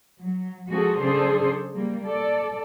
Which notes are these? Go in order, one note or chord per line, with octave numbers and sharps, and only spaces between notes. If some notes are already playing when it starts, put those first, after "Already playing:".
F#3
F3 G#3 C4 F#4 G#4 A4
C#3 F#3 D4 G#4 A4 C5
G3 A#3
A4 D5